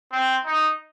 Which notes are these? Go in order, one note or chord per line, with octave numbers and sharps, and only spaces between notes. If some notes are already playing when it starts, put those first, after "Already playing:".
C4
D#4